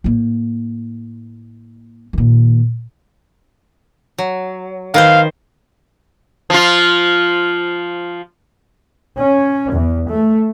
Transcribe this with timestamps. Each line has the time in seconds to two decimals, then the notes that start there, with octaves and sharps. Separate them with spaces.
0.04 A2 A#3
2.13 A#2 D#3
4.18 F#3
4.94 D#3 B4 C5 F5
6.50 F3 F4
9.19 C#4
9.71 E2
10.11 A3